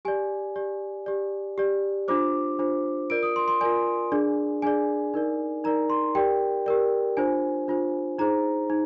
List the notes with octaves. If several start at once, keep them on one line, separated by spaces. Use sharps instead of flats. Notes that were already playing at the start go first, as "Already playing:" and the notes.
G4 D5 G#5
G4 D5
G4 D5
G4 D5
D4 F4 C5 D6
D4 F4 C5
F4 A#4 D5 D7
D#6
C6
C6
F4 A#4 D5 G#5
D4 G#4 D5
D4 G#4 D5 G#5
D#4 A#4 D5
D#4 A#4 D5 A#5
C6
G4 A#4 D5 G5
G4 A#4 D5
D4 F4 C5 G#5
D4 F4 C5
D#4 G#4 C5 A#5
D#4